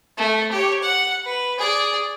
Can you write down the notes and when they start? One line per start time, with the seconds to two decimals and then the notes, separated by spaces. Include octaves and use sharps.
0.17 A3
0.51 G4 C#5
0.83 F#5
1.25 B4
1.58 G#4 D5